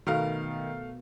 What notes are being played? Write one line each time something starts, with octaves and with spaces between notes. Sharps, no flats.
B2 D#3 A3 A#4 F5